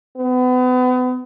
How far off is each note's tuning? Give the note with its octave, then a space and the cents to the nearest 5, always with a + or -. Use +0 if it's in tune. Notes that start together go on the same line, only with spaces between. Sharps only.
B3 +35